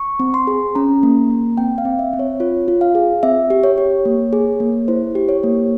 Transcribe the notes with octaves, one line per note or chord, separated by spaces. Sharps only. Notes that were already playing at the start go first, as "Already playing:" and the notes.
Already playing: C#6
C4
C6
G#4
C#4 A#5
A#3
A#3
C4 G5
F5
C4
E5
C4
C#5
F4 C#5
F4
F5
G#4
C4 E5
G4
C#5
G4
A#3
G#4
A#3
E4 C5
G4
C#5
A#3